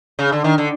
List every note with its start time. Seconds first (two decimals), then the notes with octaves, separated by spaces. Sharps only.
0.19 C#3
0.32 D3
0.44 D#3
0.58 D3